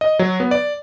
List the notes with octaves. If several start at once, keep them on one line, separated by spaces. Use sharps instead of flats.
D#5
F#3
B3
D5